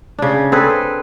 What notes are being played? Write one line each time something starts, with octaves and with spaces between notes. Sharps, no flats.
C#3 D4
C4 G#4 A4 B4